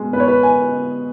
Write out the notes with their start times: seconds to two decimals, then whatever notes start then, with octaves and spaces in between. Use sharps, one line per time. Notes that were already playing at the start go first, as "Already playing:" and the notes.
Already playing: B2 G#3
0.13 B3 B4
0.20 C#5
0.28 B4
0.43 G#5